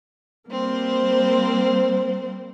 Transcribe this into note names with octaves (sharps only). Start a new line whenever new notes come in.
G3 A#3 C4 C5